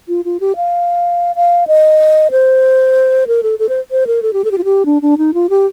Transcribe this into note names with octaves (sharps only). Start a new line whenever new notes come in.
F4
F4
G4
F5
F5
D#5
C5
A#4
A4
A4
C5
C5
A#4
A4
G4
A4
G4
F4
G4
D4
D4
D#4
F4
G4